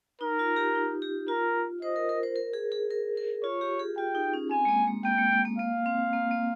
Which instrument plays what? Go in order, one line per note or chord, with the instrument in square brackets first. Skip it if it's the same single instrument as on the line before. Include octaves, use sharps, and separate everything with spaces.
[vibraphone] D#4 [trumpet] A#4
[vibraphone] F4
G4
D#4
G4
[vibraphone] F4 [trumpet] A#4
[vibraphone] C5 [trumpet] D#5
[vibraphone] A#4
A#4
C5
A#4
G#4
G#4
A#4
A#4
[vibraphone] F4 [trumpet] C#5
[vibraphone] G4
G#4
[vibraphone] F4 [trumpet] G5
[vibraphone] D#4
C#4
[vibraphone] C4 [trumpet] G#5
[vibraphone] G#3
A#3
G#3
[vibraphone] A#3 [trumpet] G5
[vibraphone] G#3
G#3
A#3
[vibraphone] A#3 [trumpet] F5
[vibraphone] C4
A#3
A#3